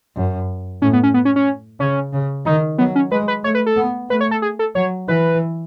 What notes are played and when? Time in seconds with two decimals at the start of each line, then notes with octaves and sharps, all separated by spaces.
0.16 F#2
0.82 A2 C#4
0.93 B3
1.03 C#4
1.14 B3
1.25 C#4
1.36 C#4
1.80 C#3 C#4
2.13 C#3
2.46 D#3 D#4
2.78 F#3 B3
2.96 C#4
3.11 G#3 B4
3.28 B4
3.44 A3 C#5
3.55 B4
3.66 A4
3.77 B3
4.10 A3 B4
4.21 C#5
4.31 A4
4.42 G#4
4.59 A4
4.75 F#3 C#5
5.08 E3 B4